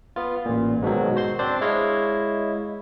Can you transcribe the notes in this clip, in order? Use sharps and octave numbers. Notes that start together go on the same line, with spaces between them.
B3 F4
A1 A#2
G#2 B2 D#3 F#3
F#4 C5 C6
C4 D4 C5 D5
G#3 E4 C#5 D#5 F5